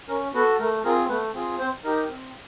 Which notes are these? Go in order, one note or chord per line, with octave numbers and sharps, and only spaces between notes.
C#4 A#4
B3 F#4 A4 B4
A3 A#4
C4 F4 G#4 A#4
A3 B3 B4
C4 F4 G#4
C4 C5
D#4 G4 A#4
C4